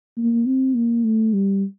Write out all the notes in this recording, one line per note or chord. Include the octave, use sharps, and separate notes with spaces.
A#3
C4
A#3
A3
G3